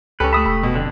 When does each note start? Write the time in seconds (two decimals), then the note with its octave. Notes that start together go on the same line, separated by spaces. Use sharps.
0.20 C#2 C#4 G4 A4 B4
0.33 A3 E5 B5 D#6
0.46 E1 B5
0.63 B2
0.75 F2 D3